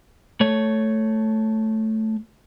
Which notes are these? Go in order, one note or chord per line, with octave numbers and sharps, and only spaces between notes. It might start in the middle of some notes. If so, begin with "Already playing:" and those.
A3 C#5